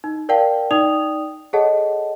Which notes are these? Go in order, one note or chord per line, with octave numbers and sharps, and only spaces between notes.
D#4
A#4 D5 F5 G5 A5
D#4 D5 G5 D#6 F7
G#4 A4 C#5 D#5 F#5 A5